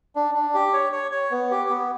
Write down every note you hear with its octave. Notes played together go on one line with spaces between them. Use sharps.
D4
D4
G4
C#5
C#5
C#5
B3
G4
B3